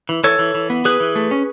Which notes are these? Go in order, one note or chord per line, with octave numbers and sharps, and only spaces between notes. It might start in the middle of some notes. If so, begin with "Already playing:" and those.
E3
E3 A4 C#5
E3
E3
B3
E3 G#4 B4
E3
A3
C#4